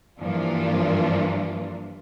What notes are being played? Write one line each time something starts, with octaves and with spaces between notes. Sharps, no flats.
G2 E3 F3 A#3 D4 F4